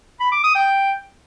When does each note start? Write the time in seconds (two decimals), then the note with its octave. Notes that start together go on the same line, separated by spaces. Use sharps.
0.20 B5
0.32 D6
0.43 D#6
0.55 G5